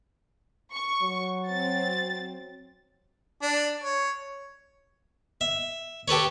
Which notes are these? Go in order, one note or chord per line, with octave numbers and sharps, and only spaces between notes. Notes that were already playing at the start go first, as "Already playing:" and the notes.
C#6
F#3
C4 A6
D4
C#5
E5
G4 A4 B4 C#5